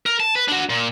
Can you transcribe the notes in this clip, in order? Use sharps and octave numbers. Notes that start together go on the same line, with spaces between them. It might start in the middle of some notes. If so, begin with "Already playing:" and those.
A#4
A5
B4
D4 F#4
A#2